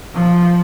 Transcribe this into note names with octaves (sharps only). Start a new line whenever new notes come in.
F3